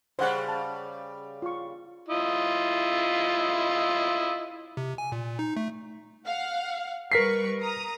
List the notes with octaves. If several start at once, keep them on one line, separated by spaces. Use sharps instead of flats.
C#3 G3 C5 F5 F#5
A5
F4 F5 C#6
E4 F4 D#5
C3
G#5
A#2
D#4
A3
F5 F#5
G3 A#4 B4 C#6 B6 C7
A#5 D#6